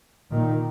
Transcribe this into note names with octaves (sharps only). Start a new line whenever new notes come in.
A#2 D#3